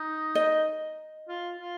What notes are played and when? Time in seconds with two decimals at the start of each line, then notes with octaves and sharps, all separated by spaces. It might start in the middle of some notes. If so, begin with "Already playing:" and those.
Already playing: D#4
0.35 D#5
1.28 F4
1.60 F4